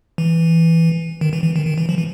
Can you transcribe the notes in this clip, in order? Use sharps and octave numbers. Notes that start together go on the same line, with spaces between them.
E3
D#3
E3
E3
D#3
D#3
E3
F3
E3